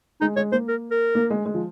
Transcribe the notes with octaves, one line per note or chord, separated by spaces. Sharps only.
G#3 D#4
G#3 C#5
A#3 C5
A#4
A#4
A#3
G#3
G#3
F3